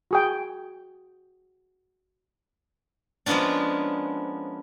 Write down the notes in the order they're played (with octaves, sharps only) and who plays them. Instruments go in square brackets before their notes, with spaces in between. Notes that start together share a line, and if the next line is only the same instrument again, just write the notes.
[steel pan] F#4 G#4 G5
[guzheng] F3 G#3 A#3 B3 C#4 D4